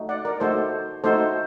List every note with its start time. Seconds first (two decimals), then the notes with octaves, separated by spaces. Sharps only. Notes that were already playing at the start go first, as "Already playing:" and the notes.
Already playing: A3 D#4 F#4
0.09 D5 F#5
0.25 A#4 D5
0.40 A3 D#4 F#4 A4 C5
1.04 A3 D#4 F#4 A4 C5